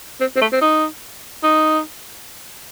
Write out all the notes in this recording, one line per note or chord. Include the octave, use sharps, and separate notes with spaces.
C4
C4
A3
C4
D#4
D#4